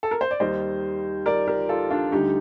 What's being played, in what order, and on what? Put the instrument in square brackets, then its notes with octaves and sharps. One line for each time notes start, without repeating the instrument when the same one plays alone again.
[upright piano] A4
A#4
C5
D5
D#2 D#3 G3 C5 D#5
A#4 D5
G4 A#4
F4 A4
D4 F4
D2 D3 G3 D#4 G4